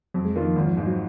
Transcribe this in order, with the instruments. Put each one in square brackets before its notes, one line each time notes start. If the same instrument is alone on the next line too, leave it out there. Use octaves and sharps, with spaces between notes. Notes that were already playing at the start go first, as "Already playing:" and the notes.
[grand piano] F2 [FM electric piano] F#3
[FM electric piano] G#3
[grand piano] D#3 A#3 F4
[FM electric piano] F3
[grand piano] G#1 [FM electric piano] D#3
[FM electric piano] F3
[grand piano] G#2 F3 [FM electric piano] G#3
[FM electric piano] F#3